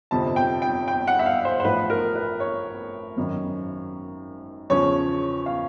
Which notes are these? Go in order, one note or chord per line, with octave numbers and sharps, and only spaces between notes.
G1 F2 C3 F3 A5
G5
G5
G5
F#5
E5
F5
C5
C5
A1 A2 F3 B4
A#4
B4
C#5
G#1 F#2 D#3
E2 C#3 F3 C#5
F5